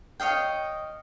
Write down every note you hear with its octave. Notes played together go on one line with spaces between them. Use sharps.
C#5 D#5 F5 G5